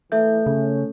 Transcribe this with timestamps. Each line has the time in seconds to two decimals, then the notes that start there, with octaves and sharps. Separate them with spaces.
0.12 E3 A3 A4 E5 G6
0.46 C#3 C#4